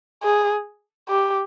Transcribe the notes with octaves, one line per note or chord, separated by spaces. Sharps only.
G#4
G4